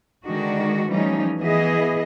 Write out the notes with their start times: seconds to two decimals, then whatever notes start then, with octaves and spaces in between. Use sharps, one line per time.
0.26 D3 D#3 G#3 D4 F#4
0.89 E3 F3 G3 A3 C#4 D#4
1.39 E3 B3 E4 G#4 D#5